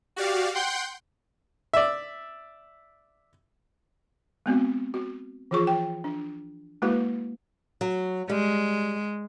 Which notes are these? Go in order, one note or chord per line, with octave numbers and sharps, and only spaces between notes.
F#4 G4 D5 F5
F#5 G5 C6 G6
D5 E5
G#3 B3 C4 F#4
F#4
E3 F3 F4 G#4 C#6
G5
D4
G#3 A#3 E4 F#4 B4
F#3
G3 G#3